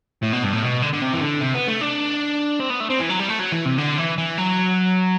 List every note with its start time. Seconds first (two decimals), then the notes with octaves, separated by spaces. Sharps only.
0.23 A2
0.33 B2
0.43 G2
0.53 A2
0.63 B2
0.82 D3
0.93 D3
1.02 C3
1.14 E3
1.22 D3
1.41 C3
1.55 B3
1.68 A3
1.81 D4
2.60 C4
2.70 B3
2.80 A3
2.90 C4
2.99 E3
3.10 F#3
3.19 G3
3.29 A3
3.39 F#3
3.52 E3
3.65 C3
3.78 D3
3.98 E3
4.18 E3
4.38 F#3